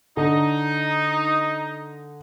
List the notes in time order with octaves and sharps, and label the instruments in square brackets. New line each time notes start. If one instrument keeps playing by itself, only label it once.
[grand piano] D3 [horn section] D#4